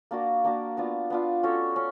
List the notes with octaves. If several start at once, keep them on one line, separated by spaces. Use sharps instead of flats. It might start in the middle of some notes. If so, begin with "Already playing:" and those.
A#3 D4 F#4 A#4
A#3 D4 F#4 A#4
B3 D4 F4
B3 D4 F4
C#4 F#4 A4 C#5
C#4